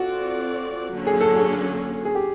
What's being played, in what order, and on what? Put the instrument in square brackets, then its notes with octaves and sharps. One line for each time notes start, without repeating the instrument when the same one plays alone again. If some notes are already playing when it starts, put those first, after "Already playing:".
Already playing: [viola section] C4 F4 A4 D5 [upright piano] F#4
[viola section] D3 F#3 A#3 C#4
[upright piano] G#4
A4
G#4
G#4
G4